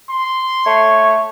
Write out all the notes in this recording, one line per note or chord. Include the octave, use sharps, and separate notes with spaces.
C6
A3 C#5